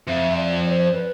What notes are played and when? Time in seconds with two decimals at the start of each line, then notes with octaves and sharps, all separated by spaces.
0.07 F2 E5
0.36 D5
0.65 D5
0.70 C5
0.93 B4